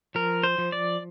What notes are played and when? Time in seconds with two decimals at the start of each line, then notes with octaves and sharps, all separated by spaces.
0.15 F3 A#4
0.43 C5
0.58 F3
0.72 D5